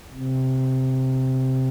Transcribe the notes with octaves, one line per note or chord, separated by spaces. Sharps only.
C3